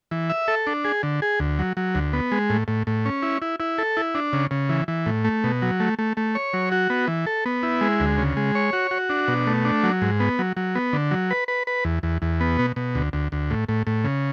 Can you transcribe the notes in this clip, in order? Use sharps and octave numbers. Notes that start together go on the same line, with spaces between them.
E3
E5
A4
D4
G#4
D3
G#4
D2
F#3
F#3
D2
B3
G#3
A2
A2
A2
C#4
E4
E4
E4
A4
E4
D4
C#3
C#3
E3
E3
A2
A3
B2
F#3
A3
A3
A3
C#5
F#3
F#4
B3
E3
A4
B3
E4
G#3
D2
C#3
G#3
C#5
F#4
F#4
D4
B2
A3
D4
F#3
G#2
B3
F#3
F#3
B3
D3
F#3
B4
B4
B4
E2
E2
E2
B3
B2
B2
D2
D2
D2
A2
A2
A2
C#3